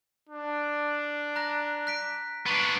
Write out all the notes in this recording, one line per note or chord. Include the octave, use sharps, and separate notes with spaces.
D4
A#5 F#6 A#6
F#6 B6 D7
B3 D4 C#6